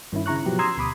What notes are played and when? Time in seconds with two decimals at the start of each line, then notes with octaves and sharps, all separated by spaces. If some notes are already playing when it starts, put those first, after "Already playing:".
0.12 G2 D#3 C#4 E4
0.26 C#3 E4 A#5 C#6 F#6
0.46 B2 F3 F#3 B3 G4
0.59 A#5 C6 D#6 E6 G#6 C7
0.77 D2 B2 B5 D6 D#6